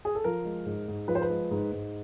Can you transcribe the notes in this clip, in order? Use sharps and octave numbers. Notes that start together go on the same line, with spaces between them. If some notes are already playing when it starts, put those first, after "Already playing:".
G#4
A4
F3 A#4
G#3
G#2
G#2
F3 B4
C5
B4
G#3
G#2
G#2